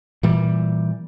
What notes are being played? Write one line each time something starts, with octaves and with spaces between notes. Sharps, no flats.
A#2 E3 G3